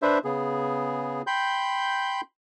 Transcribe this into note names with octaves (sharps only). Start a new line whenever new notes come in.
D4 B4 C5 E5
C#3 B3 G#4
G5 B5 C6 G6